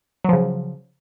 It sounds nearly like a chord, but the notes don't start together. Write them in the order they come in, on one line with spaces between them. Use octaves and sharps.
F#3 F3 C#3